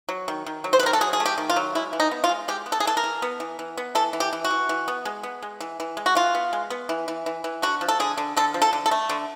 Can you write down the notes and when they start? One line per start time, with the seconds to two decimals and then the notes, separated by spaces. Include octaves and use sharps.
0.09 F#3
0.28 D#3
0.46 D#3
0.64 F#3
0.73 C5
0.79 B4
0.83 D#3 A#4
0.93 A4
1.01 F#3 G#4
1.13 G#4
1.20 A3
1.26 G4
1.38 D#3
1.50 F4
1.56 F#3
1.75 G#3 E4
1.93 E3
2.00 D#4
2.11 B3
2.24 F4
2.29 G#3
2.48 G#3 G4
2.66 B3
2.72 A4
2.80 G#4
2.85 E3 A4
2.97 A#4
3.04 E3
3.22 B3
3.40 E3
3.59 E3
3.77 B3
3.95 E3 A4
4.13 E3
4.20 G4
4.33 E3
4.44 F#4
4.50 E3
4.69 E3
4.88 B3
5.05 G#3
5.23 B3
5.42 G#3
5.60 E3
5.80 E3
5.97 G#3
6.06 F#4
6.15 E3 F4
6.35 B3
6.53 G#3
6.70 B3
6.89 E3
7.08 E3
7.26 E3
7.44 E3
7.62 D3 F#4
7.81 F3
7.88 A4
8.00 D3 G#4
8.17 D3
8.37 D3 A4
8.54 F3
8.62 A4
8.73 D3
8.86 A4
8.91 A3
9.09 D3